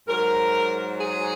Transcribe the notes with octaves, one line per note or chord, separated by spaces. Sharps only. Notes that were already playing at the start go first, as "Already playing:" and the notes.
G#2 F#3 A#4
G#4